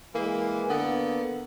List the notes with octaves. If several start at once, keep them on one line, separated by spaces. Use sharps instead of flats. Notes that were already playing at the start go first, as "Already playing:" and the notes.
E3 G#3 A#3
D3 A#3 B3